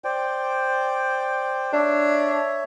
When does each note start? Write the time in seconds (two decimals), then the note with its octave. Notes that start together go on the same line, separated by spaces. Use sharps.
0.04 C5 D5 G5
1.73 D4 C#5 E5